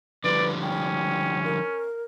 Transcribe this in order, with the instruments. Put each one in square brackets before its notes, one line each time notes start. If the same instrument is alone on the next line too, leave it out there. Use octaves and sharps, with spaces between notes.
[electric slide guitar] D3 F3 G3 [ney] B4 [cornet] D5
[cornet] C#4 [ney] G5
[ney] A#4